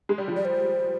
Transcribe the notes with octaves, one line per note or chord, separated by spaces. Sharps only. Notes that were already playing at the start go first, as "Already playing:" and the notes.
G#3
G3
F3
G3 D5
C5